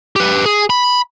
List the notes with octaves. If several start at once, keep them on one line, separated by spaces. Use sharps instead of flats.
G4 B4
G#4
B5